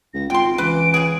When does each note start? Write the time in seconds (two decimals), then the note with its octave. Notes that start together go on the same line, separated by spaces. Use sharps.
0.14 C#2 A#6
0.30 G#1 F4 G5 C6 D7
0.58 C#2 E3 B4 D7
0.94 C#3 G#4